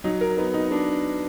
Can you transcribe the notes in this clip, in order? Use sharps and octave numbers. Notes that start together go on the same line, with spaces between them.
F#3 D#4
A#4
B3 D#4
D#4
B3 D4